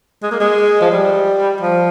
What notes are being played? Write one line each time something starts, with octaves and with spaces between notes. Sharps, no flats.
G#3
A#3
G#3
F3
G3
F3